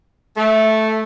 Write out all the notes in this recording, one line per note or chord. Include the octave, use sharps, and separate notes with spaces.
A3